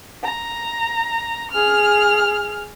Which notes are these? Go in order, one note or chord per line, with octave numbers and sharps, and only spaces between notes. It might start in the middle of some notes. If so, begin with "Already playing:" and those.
A#5
G#4 F6